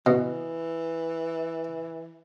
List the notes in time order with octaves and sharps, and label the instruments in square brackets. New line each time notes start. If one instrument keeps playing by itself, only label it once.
[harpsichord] B2 [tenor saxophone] E3